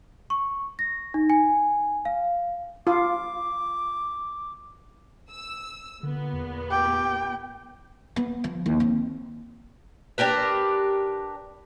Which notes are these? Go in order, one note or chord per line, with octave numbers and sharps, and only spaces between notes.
C#6
A#6
D#4
G#5
F5
F4 D6
E6
A#2 D3 B3
E2
G4 G5
B3
F3
D#2
C4
D4 G4 A#4 B4